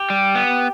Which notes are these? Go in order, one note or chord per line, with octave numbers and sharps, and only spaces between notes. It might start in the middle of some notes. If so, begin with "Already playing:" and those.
Already playing: G4
G3
B3